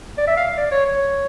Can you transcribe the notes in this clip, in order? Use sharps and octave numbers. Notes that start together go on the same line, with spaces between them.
D5
E5
F5
D5
C#5
C#5